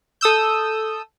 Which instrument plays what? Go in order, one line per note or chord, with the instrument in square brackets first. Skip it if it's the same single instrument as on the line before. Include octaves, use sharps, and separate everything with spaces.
[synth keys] A4 D#6 E6 G6